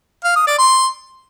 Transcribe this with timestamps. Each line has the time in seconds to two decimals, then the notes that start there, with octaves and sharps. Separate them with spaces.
0.24 F5
0.36 D#6
0.47 D5
0.58 C6